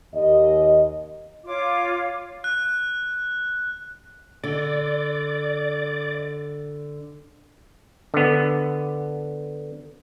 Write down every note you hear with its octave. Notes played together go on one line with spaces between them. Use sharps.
D#2 D#5
F4 C#5 F5 D6
F#6
D3 D5
D3 B3